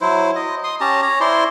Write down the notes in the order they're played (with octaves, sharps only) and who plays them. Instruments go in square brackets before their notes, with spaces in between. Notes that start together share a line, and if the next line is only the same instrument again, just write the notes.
[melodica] F#3 E4 C5
D#5
C6 D#6
C#4 G4 A5 A#5
C#5 A#5
E4 C5 D5 C6